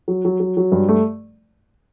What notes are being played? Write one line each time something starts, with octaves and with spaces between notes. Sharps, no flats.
F#3
F#3
F#3
F#3
G2
A3